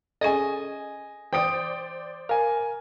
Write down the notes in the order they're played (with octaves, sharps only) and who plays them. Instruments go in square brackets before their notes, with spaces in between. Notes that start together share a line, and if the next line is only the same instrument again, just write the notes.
[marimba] C#4 G#4 A4 [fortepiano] D#5 G#5
[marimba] E3 [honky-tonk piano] C5 D5 D7 [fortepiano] G5 D#6
[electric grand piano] A#4 G#5 [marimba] F5